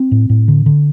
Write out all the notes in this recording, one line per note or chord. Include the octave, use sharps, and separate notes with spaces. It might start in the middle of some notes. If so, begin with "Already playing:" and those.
Already playing: C4
A2
A2
D3
D3